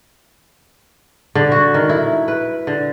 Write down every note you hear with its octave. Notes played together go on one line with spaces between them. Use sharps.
D3
F#4
D#3
E4
B4
D3